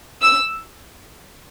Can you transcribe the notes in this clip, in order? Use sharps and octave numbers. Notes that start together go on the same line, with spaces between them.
E6